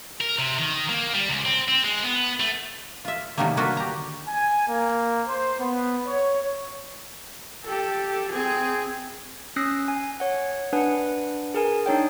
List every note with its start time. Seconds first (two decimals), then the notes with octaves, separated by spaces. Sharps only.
0.21 A#4
0.39 C3
0.58 D#3
0.89 A#3
1.14 G3
1.29 C#2
1.45 C4
1.68 C4
1.84 G#3
2.04 B3
2.40 A3
3.05 F4 E5
3.37 C3 D#3 F#3 G3 A3 A#3
3.57 D3 A#3 F4 F#4 A4 B4
3.77 G4 A#5
4.28 G#5
4.69 A#3
5.27 C5
5.59 B3
6.07 C#5
7.64 G4 A4
8.31 C4 G#4
9.56 C#4 D#6 E6 F#6 A#6 C7
9.88 G#5
10.20 C#5 F#5
10.73 D4 B4 F#5 G#5
11.54 G#4 A#4 G#5
11.86 D4 D#4 C#5 G5